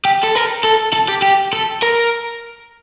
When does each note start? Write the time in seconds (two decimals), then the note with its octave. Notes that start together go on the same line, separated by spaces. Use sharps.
0.05 G4
0.23 A4
0.35 A#4
0.64 A4
0.93 A4
1.08 G4
1.22 G4
1.53 A4
1.82 A#4